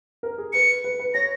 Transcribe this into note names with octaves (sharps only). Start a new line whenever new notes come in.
A#4
G#4
B4 C#7
B4
B4
C#5 A#6